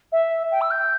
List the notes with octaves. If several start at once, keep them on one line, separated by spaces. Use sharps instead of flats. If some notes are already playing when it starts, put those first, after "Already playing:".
E5
G5
E6
G6